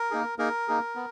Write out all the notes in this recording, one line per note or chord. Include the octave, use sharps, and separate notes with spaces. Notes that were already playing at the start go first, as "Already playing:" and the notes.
Already playing: A#4
A#3 D#4 G#4
A#3 D#4 G#4 A#4
A#3 D#4 G#4
B3